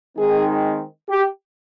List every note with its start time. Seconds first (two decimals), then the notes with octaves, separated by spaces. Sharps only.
0.17 D#3 G#3 C4 D#4 G#4
1.09 G4